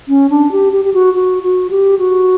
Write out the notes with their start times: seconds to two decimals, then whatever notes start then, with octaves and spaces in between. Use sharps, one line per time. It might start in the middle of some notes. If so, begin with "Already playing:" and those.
0.08 C#4
0.30 D4
0.52 G4
0.73 G4
0.85 G4
0.94 F#4
1.14 F#4
1.43 F#4
1.70 G4
1.99 F#4